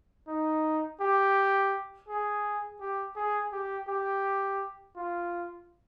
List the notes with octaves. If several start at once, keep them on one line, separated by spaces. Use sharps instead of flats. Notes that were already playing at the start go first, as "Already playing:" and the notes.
D#4
G4
G#4
G4
G#4
G4
G4
F4